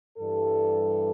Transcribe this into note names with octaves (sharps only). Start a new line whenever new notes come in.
G2 E3 G3 A4